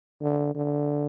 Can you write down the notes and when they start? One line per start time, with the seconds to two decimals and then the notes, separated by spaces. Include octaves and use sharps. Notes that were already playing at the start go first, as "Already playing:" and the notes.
0.21 D3
0.55 D3